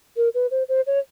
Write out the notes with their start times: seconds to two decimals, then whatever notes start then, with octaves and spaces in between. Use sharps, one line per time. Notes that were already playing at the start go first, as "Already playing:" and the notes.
0.17 A#4
0.34 B4
0.51 C5
0.69 C5
0.87 C#5